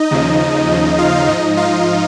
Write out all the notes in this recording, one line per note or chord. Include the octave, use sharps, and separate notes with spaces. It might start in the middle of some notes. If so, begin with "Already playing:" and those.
Already playing: D#4 D#5
D#2 C#3 F3
D#2 C#3 F3
F4 F5
G#2 F3 D#4 D#5
F4 F5